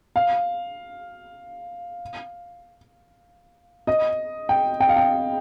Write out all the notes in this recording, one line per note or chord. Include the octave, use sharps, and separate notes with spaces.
F5
D#5
G5
G5
F5
G5